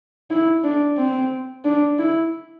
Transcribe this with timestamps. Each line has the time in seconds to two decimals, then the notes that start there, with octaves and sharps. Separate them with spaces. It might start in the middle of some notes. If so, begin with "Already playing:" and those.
0.30 E4
0.64 D4
0.97 C4
1.65 D4
1.99 E4